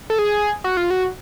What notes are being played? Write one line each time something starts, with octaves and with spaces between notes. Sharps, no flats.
A4
G#4
F#4
F4
F#4